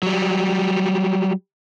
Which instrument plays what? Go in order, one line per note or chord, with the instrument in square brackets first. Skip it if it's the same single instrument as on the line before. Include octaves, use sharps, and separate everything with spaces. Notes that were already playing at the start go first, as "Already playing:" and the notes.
[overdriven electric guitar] F#3 G3